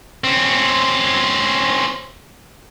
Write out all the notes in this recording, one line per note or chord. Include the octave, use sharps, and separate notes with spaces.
C4 C#4